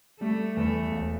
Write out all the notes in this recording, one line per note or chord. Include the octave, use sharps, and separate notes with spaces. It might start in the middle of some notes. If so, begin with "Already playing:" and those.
G3 A3
E2 A3
E1